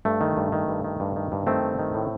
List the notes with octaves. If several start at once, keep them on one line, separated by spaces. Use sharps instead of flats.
G2 A3
D#3
G2
D#3
G2
D#3
G2
D#3
G2
D#3 A3 C4
G2
D#3
A2